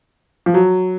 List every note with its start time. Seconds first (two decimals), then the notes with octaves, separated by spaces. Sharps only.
0.46 F3
0.54 F#3